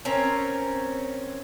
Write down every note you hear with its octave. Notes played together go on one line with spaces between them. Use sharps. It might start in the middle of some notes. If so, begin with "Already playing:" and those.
C4 C#4 A#4